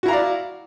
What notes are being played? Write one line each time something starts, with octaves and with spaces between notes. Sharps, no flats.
E4 F#4 D5 F5 A#5